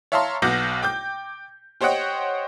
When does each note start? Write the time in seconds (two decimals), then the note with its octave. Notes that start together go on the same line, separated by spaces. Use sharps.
0.12 C#5 E5 F5 A5 A#5 C6
0.42 B1 B2 F#4 D6 G6 A#6
0.83 G5 D6 G6
1.81 G4 C5 C#5 D#5 F#5 G5